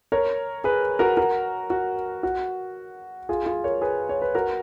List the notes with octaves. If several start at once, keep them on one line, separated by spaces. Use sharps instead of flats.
A#4 C#5
G#4 B4
F#4 A#4
F#4 A#4
F#4
F#4
F4 G#4
F4 G#4
A#4 C#5
G#4 B4
C#5
B4
F#4 A#4